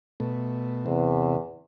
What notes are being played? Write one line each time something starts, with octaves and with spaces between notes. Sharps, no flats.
B2 A3
E2 C3